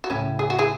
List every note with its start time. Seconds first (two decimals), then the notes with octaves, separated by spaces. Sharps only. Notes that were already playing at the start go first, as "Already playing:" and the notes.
0.04 F#4
0.10 A2 C#3 C#4 E4
0.39 G#4
0.50 F#4
0.58 E4 G#4